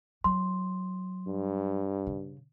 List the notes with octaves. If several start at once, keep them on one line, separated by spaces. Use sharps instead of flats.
F#3 C6
G2
C#3